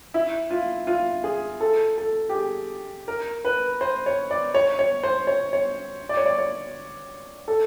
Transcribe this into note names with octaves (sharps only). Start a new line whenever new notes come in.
E4
F4
F4
G#4
A4
A4
G4
G#4
A#4
B4
C5
C#5
D5
C#5
C#5
C5
C#5
C#5
D5
C#5
D5
C#5
A4